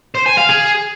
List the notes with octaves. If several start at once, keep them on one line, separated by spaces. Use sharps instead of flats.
C5
G#5
F5
G#4